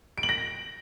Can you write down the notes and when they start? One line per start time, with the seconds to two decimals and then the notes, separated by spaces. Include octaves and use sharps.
0.18 D7
0.23 F#7
0.29 A#6